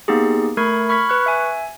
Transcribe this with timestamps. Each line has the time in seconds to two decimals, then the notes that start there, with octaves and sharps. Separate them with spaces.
0.08 A#3 B3 D#4 G4 G#4
0.57 A3 A#4 B5 C#6 G#6
0.89 B5 C#6 F6 G#6 B6
1.09 B4 C#6 F#6
1.26 E5 G#5